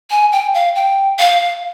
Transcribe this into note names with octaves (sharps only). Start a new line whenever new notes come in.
G#5
G5
F5
G5
F5